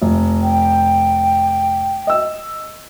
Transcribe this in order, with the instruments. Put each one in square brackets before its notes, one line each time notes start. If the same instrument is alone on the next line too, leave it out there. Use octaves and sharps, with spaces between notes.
[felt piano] F1
[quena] G5
[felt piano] D#5 E6